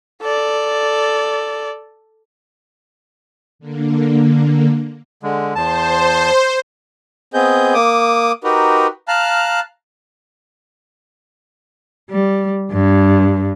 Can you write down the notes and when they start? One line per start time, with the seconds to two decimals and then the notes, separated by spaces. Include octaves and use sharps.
0.22 A4 D5
3.59 D3 A#3
5.23 D3 G#3
5.55 E2 C5 A5
7.34 B3 C4 G#4 D#5 G6
7.74 A#3 D6 D#6
8.44 D#4 F#4 G4 A#4 B4
9.08 F5 A5 A#5 F6 F#6
12.10 G3
12.71 G2